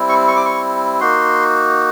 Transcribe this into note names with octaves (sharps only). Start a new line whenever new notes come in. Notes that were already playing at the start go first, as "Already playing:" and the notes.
Already playing: G3 C4 E4
C#6
C#6
D6
C#6
A#3 D#4 F#4 C6